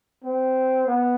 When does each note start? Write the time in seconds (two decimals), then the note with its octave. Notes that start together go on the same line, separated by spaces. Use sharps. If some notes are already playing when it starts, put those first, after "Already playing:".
0.24 C4
0.87 B3